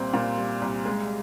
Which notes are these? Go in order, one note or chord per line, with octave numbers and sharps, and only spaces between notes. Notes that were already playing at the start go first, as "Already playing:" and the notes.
Already playing: C2 A#2 G3 C4
A#2
G3
C2
G#3